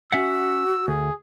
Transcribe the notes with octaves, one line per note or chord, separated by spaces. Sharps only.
C#4 F#4 E5 F#5 E6
D2 G#4